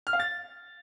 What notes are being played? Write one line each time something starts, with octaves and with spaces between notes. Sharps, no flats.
F6
F5
A6